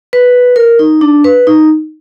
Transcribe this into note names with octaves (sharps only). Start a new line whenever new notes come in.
B4
A#4
D#4
D4
B4
D#4